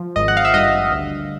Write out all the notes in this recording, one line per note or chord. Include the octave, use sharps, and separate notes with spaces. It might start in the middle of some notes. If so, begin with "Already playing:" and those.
Already playing: F3
G#1 D#5
F#5
F5
E5
G2 D#5
D2